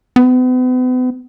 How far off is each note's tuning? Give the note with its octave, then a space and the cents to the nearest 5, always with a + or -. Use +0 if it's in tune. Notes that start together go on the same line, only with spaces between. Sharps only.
B3 +40